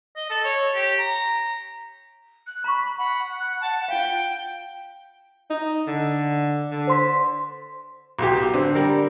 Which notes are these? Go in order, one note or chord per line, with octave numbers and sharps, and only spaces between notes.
D#5
A4
C#5
G4
A#5
F#6
A#5 B5 C#6
F#5 B5
F#6
A5
F4 F5 G5
D#4
D3
D3
C5 C6 B6
B1 G4
D3 C4
G3 A#4